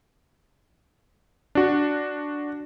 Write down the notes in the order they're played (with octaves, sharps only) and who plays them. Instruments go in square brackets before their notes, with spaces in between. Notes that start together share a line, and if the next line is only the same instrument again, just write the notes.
[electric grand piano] D4 F#4